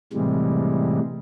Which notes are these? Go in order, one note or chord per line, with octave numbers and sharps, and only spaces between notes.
A2 C3 E3 G3 G#3